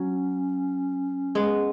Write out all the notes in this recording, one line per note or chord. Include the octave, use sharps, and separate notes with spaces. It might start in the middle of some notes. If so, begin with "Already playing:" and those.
Already playing: F#3 C#4
G#3 B3